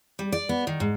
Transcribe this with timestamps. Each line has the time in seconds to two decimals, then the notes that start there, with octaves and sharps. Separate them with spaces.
0.19 G3
0.32 D5
0.49 B3
0.67 D#3
0.80 G#2